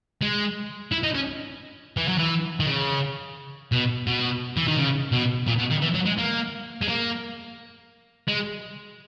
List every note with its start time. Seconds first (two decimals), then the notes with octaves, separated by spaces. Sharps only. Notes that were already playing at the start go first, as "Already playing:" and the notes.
0.22 G#3
0.92 E4
1.03 D#4
1.15 C#4
1.97 E3
2.08 F#3
2.18 E3
2.60 D#3
2.66 C#3
3.72 B2
4.07 B2
4.57 E3
4.68 D#3
4.77 C#3
5.12 B2
5.47 A#2
5.59 B2
5.71 D#3
5.82 E3
5.95 F#3
6.06 G#3
6.18 A#3
6.81 G#3
6.88 A#3
8.28 G#3